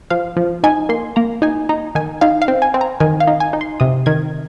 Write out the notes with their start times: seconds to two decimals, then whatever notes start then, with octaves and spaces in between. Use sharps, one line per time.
0.10 F3 F5
0.37 F3
0.63 D#4 G#5
0.89 A#3 C6
1.16 A#3 A#5
1.42 D#4 G#5
1.69 D#4 A#5
1.95 D#3 G#5
2.21 D#4 F5
2.42 F5
2.48 C4
2.62 G#5
2.74 C4
2.81 A#5
3.00 D#3 G#5
3.20 F5
3.27 D#4
3.40 G#5
3.53 D#4
3.61 C6
3.80 C3 D#6
4.06 D#3 G#6